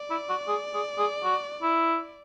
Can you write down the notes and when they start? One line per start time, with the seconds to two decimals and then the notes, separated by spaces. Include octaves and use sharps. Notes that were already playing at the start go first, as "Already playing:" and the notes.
Already playing: D5
0.10 E4
0.29 F#4
0.48 G#4
0.74 G#4
0.98 G#4
1.24 F#4
1.63 E4